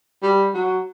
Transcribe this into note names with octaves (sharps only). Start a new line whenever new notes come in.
G3
F#3